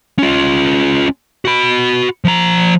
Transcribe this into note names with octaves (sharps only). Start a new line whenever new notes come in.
C#4 F4
F#4 B5
F3 A#5